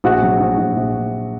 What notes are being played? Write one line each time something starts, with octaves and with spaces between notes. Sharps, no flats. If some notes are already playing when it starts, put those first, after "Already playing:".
A#1 F#4
F#3
A#1
A#1
A#1